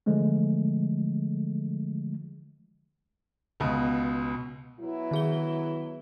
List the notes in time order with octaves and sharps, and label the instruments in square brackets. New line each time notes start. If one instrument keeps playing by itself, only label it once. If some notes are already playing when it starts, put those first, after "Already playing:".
[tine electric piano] D3 E3 F3 G#3 A3
[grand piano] C#2 B2
[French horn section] F#3 B3 E4
[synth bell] D#3 G#4 G7